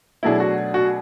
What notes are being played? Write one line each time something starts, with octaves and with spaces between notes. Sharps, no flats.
B2 F#3 A3 D4 E4 G#4
F#4
F#4